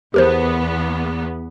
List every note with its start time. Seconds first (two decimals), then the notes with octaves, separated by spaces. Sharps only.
0.14 E2 B3 G4 A#4 C5